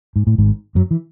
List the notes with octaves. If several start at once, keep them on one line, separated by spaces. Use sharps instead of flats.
G#2
A2
G#1 G#2
F#2 F#3
E3